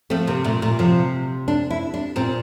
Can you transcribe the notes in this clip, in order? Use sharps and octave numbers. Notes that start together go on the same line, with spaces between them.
F3 A3 C4
C3 A#3
A#2 A3
A#2 A3
C3 F3
D4
E4
D4
A#2 C4